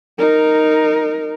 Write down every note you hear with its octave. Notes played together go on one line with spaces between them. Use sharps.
D#4 A#4